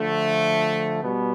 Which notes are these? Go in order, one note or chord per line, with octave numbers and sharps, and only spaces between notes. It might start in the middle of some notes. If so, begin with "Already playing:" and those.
Already playing: D3 F3 A3
B2 G3 B3